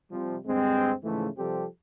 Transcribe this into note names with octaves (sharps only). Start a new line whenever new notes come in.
C3 F3 G3
D2 G2 G#3 C4
G#2 C#3 E3 F3 A3
C3 F3 G3 C4 G4 A4